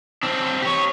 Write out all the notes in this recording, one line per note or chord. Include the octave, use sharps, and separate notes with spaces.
C4 D4
G4 C#5